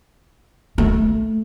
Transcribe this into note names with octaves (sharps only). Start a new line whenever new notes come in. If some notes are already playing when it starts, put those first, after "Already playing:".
A3